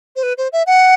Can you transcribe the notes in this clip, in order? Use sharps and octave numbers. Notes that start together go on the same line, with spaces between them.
C5
B4
C5
E5
F#5